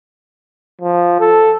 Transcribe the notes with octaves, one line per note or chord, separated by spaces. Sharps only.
F3
A4